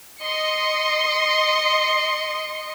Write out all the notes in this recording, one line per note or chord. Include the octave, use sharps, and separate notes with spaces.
D#5 C6 C#7